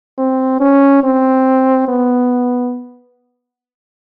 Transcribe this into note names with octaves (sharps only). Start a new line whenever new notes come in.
C4
C#4
C4
B3